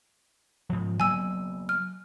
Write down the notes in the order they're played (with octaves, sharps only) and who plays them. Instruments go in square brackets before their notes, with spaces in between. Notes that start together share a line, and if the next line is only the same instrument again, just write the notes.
[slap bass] G#2 F3
[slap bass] F#3 A#3 B3 [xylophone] G#5 E6
[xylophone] F6